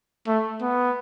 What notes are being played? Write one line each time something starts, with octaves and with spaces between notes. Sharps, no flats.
A3
B3